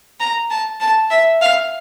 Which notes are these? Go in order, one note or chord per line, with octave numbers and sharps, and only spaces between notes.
A#5
A5
A5
E5
F5